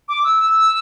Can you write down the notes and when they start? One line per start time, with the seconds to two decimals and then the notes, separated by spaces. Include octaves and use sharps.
0.09 D6
0.24 E6
0.39 E6